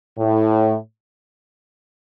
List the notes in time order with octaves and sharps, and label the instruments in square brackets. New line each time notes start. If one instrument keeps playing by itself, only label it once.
[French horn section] A2